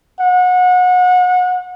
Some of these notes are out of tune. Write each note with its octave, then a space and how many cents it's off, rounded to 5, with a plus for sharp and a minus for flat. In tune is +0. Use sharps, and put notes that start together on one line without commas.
F#5 -30